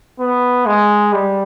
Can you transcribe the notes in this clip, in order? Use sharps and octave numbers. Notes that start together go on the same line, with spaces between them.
B3
G#3
G3